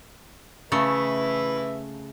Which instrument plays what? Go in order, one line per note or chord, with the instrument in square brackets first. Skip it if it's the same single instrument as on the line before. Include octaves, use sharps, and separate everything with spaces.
[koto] C#3 A3 [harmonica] B4 E5